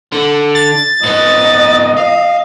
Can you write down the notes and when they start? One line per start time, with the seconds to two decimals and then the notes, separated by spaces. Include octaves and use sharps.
0.12 D3
0.55 A6
1.03 G#2 B3 D#5
1.98 F5